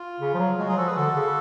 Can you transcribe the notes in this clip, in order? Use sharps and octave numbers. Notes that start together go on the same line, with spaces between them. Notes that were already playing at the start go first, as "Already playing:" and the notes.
Already playing: F4
C#3
F3
F#3
G#3 F#4
F#3 F4 G#4
F3 F#4 A4
G#4 B4
D3 F#4 A4
C#3